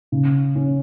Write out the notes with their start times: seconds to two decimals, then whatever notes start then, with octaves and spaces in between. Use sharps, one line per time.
0.12 C#3
0.55 C#4